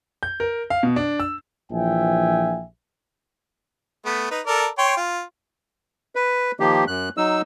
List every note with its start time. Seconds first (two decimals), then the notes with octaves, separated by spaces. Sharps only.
0.23 G6
0.40 A#4
0.70 F5
0.83 B2
0.96 D4
1.20 E6
1.71 A#1 E3 F3 E5 G5 G#5
4.05 A3 B3
4.31 D#4 B4
4.46 A4 A#4 D5
4.78 C#5 G5 C6
4.97 F4
6.16 B4
6.60 D#3 F3 A#3 G4
6.88 F#2 F#6
7.17 F#3 D#4 E6